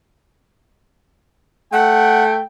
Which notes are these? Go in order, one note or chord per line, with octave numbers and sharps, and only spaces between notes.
A3 F#5 G5